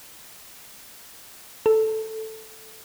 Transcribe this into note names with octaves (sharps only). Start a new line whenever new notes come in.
A4